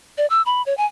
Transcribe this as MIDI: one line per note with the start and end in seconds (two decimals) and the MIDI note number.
0.18 0.26 74
0.30 0.42 88
0.46 0.62 83
0.66 0.76 73
0.78 0.86 80